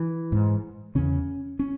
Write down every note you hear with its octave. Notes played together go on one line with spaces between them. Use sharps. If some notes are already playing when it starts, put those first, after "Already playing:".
Already playing: E3
G#2
E2 C#3 C#4
C#4